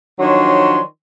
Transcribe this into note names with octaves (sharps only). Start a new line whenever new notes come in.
D#3 F3 F#3 D4 C#5 C6